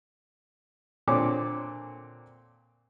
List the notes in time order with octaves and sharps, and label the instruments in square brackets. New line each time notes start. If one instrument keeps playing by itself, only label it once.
[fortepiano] A#2 D3 C4 D4 C#5 D6